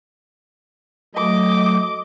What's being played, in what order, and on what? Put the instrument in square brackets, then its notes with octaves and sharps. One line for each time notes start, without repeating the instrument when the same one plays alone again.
[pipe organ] F#3 A3 [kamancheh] D#5 D6